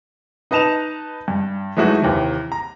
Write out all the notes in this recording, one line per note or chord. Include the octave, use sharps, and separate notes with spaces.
D#4 B4 D#5 A5 E7 F7
G2
E3 F#3 G#3 A3 D#4 F#4
D#2 C3 E3
A#5